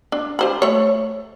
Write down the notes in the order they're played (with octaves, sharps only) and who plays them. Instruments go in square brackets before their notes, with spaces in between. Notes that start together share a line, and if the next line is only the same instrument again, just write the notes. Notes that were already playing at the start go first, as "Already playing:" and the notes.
[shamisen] D4
G4 C5 B5
A3 C#5